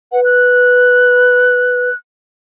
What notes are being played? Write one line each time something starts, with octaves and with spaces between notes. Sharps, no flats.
B4 F#5
F#6